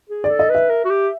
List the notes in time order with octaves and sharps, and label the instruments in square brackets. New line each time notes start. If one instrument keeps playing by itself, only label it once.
[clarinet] G#4
[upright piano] D5
[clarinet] A4
[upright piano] D#5
[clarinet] B4 [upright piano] E5
[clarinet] A#4
F#4
G4